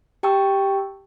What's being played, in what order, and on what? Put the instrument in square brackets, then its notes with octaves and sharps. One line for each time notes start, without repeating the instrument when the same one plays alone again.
[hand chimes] G4 G5 A5 C#6 E6